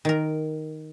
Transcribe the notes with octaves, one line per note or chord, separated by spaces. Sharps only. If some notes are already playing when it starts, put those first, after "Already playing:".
D#3 A#4